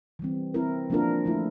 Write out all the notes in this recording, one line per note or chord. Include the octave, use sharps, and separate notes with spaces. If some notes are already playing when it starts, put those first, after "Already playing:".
E3 G3 C4
C4 E4 A#4
F3 A#3 D4 F4 A#4
F3 A3 E4